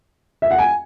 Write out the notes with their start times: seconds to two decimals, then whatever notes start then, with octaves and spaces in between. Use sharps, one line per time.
0.42 E5
0.51 F#5
0.58 G#5